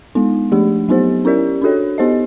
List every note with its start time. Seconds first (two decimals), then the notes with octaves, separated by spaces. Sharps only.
0.15 G#3 B3 D#4
0.52 F3 A3 D4 G4
0.89 F#3 B3 D#4 G4 C5
1.25 C#4 E4 G4 A#4 D5
1.62 D4 F#4 A4 C#5
1.98 B3 D#4 G4 C5 D#5